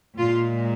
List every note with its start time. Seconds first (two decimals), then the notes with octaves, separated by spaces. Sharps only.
0.18 A#2 G#3 F4